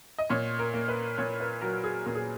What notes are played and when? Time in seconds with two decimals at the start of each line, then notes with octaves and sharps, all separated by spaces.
0.18 D#5
0.30 A#2 C#5
0.59 A#4
0.74 A#3
0.88 B4
1.18 A#2 C#5
1.40 B4
1.61 F#3 A#4
1.84 G#4
2.06 A#2 A#4
2.15 G#4